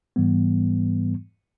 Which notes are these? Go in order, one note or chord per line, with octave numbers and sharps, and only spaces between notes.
G#2 E3 G3 B3